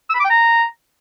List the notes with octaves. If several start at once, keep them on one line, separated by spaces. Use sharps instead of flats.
E6
B5
D6
G5
A#5